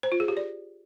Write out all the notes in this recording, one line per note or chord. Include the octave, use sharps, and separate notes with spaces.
C5
F4
G#4
G4
D5